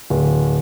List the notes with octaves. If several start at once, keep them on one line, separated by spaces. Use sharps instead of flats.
D1